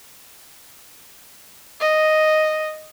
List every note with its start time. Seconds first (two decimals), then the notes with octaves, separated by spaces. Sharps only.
1.80 D#5